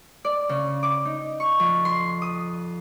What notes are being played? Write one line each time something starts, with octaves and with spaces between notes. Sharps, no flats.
D5
C#3
D6
D#4
C#6
F2
C6
D#6